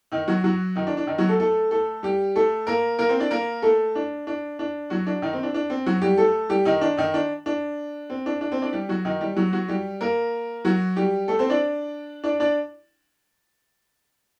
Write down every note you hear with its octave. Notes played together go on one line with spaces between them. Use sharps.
D#3 D#4
F#3 F#4
F#3 F#4
D#3 D#4
D4
D4
D#3 D#4
F#3 F#4
A3 A4
A3 A4
A3 A4
G3 G4
A3 A4
A#3 A#4
A#3 A#4
C4 C5
D4 D5
A#3 A#4
A3 A4
D4
D4
D4
F#3 F#4
D4
D#3 D#4
C4
D4
D4
C4
F#3 F#4
G3 G4
A3 A4
G3 G4
D#3 D#4
D4
D#3 D#4
D4
D4
C4
D4
D4
C4 C5
D4 D5
G3 G4
F#3 F#4
D#3 D#4
G3 G4
F#3 F#4
F#3 F#4
G3 G4
A#3 A#4
F#3 F#4
G3 G4
A3 A4
C4 C5
D4 D5
D4 D5
D4 D5